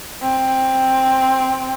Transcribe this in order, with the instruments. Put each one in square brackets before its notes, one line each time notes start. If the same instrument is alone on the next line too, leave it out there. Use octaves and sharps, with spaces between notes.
[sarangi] C4